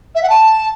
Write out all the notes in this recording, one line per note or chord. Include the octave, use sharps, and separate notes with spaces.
E5
F#5
A5